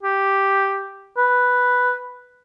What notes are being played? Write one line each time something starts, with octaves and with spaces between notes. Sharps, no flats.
G4
B4